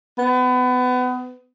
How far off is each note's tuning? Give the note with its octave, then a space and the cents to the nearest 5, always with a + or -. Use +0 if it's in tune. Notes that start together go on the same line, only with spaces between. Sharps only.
B3 +30